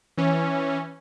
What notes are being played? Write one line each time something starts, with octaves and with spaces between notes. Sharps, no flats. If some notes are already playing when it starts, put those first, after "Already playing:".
E3 C#4